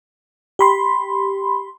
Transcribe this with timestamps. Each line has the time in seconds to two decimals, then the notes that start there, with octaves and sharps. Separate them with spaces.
0.59 G4 B5 C6